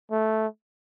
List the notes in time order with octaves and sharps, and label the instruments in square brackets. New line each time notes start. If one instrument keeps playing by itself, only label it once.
[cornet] A3